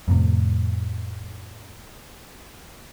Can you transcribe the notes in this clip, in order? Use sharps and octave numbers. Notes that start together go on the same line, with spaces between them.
F2 A2 C3